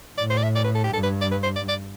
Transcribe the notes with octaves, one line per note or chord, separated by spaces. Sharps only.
A2 D5
C5
D5
E5
D5
B4
A4
G4
G2 A4
B4
D5
B4
C5
D5
D5